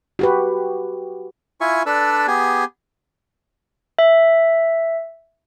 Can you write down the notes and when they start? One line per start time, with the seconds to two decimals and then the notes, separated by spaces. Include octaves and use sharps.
0.19 F#4 G4 B4
1.61 E4 F4 E5 G#5 C#6
1.86 D4 A4 B4 D5 E6
2.27 B3 G4 G#4 G#5
3.99 E5